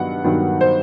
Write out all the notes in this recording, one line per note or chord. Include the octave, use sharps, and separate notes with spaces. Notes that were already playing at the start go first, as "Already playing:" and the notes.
Already playing: G2 D#3 F#3 B3 F#5
G2 D#3 F#3 B3
C5